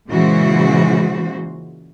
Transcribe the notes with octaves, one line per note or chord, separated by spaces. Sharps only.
A#2 C#3 E3 G#3 F#4 C5